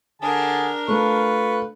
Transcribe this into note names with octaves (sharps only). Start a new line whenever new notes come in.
D3 D4 G#4 A#4 A5
A3 F4 B4 C#6